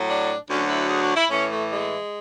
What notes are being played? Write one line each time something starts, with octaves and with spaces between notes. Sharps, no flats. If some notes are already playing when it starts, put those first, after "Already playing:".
Already playing: A2 F#3
D4
D2 D3 F#3 C#4
E4
G#4
F#4
E4
A2 E3 C#4
A3
G#3